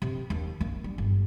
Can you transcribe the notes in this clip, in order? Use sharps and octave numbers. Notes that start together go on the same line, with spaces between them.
C3
D#2
A#3
G3
G1